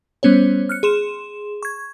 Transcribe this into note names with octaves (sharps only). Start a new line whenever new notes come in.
G3 B3 C#4 C5 C#5
F6 F#6 C#7
G#4 C6 E7
C#6 G#6